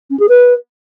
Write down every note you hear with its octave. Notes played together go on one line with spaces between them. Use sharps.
C#4
G#4
B4